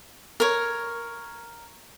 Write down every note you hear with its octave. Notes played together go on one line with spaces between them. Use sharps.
A#4 C#5